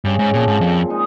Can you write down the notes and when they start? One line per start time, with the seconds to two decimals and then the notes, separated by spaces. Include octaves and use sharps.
0.05 G2 C#3
0.19 G#2
0.33 A#2 F3 C4
0.47 G#2
0.61 F2 A#2
0.90 G#3 D#4